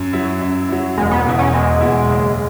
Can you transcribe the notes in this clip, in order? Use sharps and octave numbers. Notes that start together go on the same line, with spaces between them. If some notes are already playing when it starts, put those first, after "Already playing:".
Already playing: F#2
F#3 E4
F#2
F#3 E4
E1 G#3
B3
E2 B2 B3 E4
C#4
E1 G#3
E2 B2 B3 E4
F#1